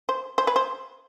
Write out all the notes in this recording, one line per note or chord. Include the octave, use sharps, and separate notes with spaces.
C5
C5
B4
C5